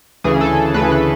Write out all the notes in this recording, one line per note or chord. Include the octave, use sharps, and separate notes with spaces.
D2 C#3 E3 G#4
A4
D2 C#3 E3 B4
B4